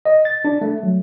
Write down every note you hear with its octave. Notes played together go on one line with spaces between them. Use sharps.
D#5
A6
D4
A3
F#3